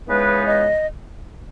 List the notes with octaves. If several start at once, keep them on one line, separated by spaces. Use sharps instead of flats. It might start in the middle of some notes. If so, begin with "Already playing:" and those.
C#3 E3 G#3 B3 D#4 B4
D#5